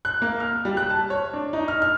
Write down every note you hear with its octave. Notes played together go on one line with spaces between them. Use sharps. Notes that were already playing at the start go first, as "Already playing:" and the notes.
F#6
A#3
F6
G3
F#6
A5
C#5
D4
D#4
F6
F6